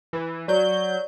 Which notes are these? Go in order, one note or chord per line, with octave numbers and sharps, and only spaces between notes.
E3
F#3 D5 G6